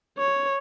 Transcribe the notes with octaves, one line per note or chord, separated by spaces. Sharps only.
C#5